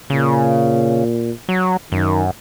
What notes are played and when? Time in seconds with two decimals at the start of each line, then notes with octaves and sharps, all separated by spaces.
0.10 A#2 C#3
1.49 F#3
1.92 F#2 D#3